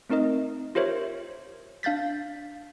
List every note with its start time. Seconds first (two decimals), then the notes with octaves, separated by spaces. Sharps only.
0.09 A3 C4 D#4 A#4 D#5
0.75 F4 G4 A#4 C5 C#5 E5
1.83 D4 F5 G6 A6 B6